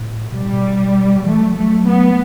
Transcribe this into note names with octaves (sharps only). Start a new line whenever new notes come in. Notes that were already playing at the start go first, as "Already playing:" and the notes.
Already playing: A2
B2 G3
A2
B2
E3 A3
F#3
F#3 A3
B3